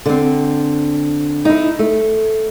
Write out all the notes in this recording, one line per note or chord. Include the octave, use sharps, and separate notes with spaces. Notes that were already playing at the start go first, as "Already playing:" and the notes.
D3 C4
D#4 E4
A3